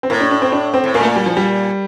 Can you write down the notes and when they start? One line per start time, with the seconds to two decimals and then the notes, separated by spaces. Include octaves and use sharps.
0.03 C4
0.10 A2 A#3
0.21 D4
0.31 D4
0.42 C4
0.52 D4
0.74 C4
0.84 A2
0.94 A#2 A#3
1.01 A3
1.05 A#3
1.16 G3
1.26 F3
1.37 G3